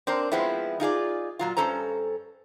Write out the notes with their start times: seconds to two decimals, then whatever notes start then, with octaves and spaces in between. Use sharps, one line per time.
0.07 C4 D4 A#4 C5
0.32 F3 G#3 B3 C4 E4
0.80 D#4 F4 G#4 D5
1.39 A#2 F#3 F4
1.57 G2 F#3 C#4 A4 C5 A#5